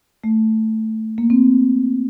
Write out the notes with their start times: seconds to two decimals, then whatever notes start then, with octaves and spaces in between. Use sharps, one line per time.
0.24 A3
1.18 A#3
1.30 C4